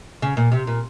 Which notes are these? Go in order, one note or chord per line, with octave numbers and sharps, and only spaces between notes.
C#3
A#2
C3
A#2